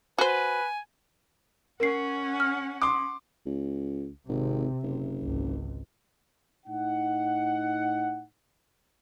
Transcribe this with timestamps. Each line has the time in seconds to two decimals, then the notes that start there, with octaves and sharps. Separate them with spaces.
0.18 F#4 B4 C5 G#5
1.80 C#4 A#4 F#5 C7
2.40 F6
2.82 C6 D6 D#6
3.45 C#2
4.28 G#1 C3
4.83 F#1
5.21 G#1 C#2
6.66 A2 D#4 F#5